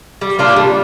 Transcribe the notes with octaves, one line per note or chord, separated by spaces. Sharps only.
G3
A#3 D4 F4
G3